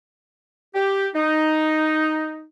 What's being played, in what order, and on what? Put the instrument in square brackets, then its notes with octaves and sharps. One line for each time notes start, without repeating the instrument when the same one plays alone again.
[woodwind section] G4
D#4